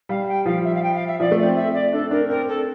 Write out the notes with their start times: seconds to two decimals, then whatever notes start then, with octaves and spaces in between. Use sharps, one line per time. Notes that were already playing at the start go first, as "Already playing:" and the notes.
0.09 G3 F5
0.28 G5
0.45 F3 F5
0.64 E5
0.75 F5
0.82 G5
0.95 F5
1.07 E5
1.19 F3 D5
1.31 A3
1.37 D5
1.43 C4
1.56 E5
1.74 D5
1.92 D4 A4
2.11 D4 A#4
2.29 C4 A#4
2.48 A4